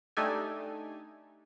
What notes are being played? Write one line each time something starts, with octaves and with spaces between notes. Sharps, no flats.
A3 D4 D#4 G4 A4 G#5